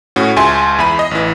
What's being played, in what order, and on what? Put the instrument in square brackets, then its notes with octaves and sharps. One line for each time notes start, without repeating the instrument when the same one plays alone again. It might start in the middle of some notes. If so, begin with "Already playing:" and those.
[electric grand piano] A2 C#4 F#4
C#2 G#3 E5 G#5 C6
E2 E5 B5 D#7
D#5
A1 E3